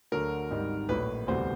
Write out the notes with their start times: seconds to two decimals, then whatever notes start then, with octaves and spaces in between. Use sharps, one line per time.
0.12 D2 D3 F#3 A#4
0.51 G#1 G#2 D#3 G3
0.89 A#1 A2 F#3 B4
1.27 E1 D2 C3 E3 G3 C5